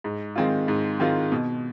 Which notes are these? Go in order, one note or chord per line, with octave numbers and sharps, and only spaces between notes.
G#2
D#3 G#3 C4 F4
G#2
D#3 G#3 C4 F4
B2